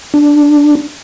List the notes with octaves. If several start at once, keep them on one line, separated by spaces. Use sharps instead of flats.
D4